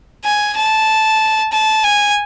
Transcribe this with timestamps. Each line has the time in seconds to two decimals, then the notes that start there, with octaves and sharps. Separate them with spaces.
0.25 G#5
0.57 A5
1.52 A5
1.84 G#5